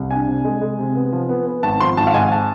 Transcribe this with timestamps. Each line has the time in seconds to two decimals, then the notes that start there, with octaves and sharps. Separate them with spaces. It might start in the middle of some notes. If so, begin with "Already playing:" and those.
Already playing: C2
0.11 D4 G#5
0.27 C3
0.45 G#3
0.61 G#3
0.79 C3
0.95 B3
1.13 F3
1.29 B3
1.46 B3
1.63 G#1 A5
1.80 F3 C6
1.97 G#1 A5
2.07 F5
2.14 G#2 G#5
2.32 A5